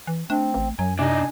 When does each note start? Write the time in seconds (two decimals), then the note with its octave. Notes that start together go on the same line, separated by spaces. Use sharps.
0.07 E3
0.30 A3 C4 D4
0.54 A1
0.79 F#2 F#3 G#5
0.99 C3 D4 D#4 G#5